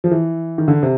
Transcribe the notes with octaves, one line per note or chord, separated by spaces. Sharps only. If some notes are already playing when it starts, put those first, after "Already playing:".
F3
E3
D#3
D3
C3